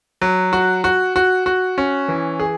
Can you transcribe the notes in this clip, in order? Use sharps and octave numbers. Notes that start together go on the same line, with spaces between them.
F#3
F#4
F#4
F#4
F#4
C#4
E3
G#4